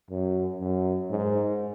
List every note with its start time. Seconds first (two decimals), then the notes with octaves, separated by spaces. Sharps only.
0.11 F#2
0.60 F#2
1.10 G#2